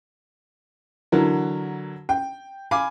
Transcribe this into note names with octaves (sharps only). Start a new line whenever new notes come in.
D3 E3 F#3 A#4
G5
F5 G#5 B5 D6